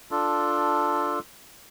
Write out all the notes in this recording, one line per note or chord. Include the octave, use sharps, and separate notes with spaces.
D4 F4 A4